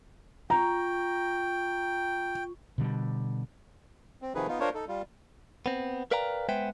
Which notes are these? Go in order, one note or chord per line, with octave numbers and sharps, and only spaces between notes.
F4 G5 A#5 C#6
B2 D3 G3
C4
C3 D#3 F3 D#4 G#4 B4
B3 D#4 F4
D4 F4 A#4 C5 C#5
D#4 A4
G3 F4
B3 C4
A#4 B4 D5 F5 G5 A#5
G#3 B3 B4 C5 E5 G5